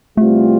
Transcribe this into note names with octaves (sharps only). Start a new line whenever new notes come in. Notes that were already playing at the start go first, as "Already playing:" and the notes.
E2 C3 G3 A3 C4 F4